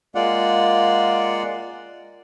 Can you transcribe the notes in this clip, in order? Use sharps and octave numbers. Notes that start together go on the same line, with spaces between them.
G#3 A#3 F4 D5 F#5